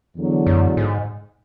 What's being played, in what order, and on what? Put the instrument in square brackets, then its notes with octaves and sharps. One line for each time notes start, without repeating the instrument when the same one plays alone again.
[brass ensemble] E2 D3 F#3
[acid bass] F#2
G#2